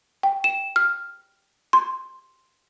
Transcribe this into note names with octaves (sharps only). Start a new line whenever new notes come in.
G5
E7
F6
C6